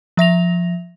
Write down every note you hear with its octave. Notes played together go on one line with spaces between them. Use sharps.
F3 E5 A#6 F7